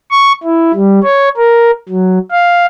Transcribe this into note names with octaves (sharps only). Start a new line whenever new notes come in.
C#6
E4
G3
C#5
A#4
F#3
F5